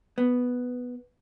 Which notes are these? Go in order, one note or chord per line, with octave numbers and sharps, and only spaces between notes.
B3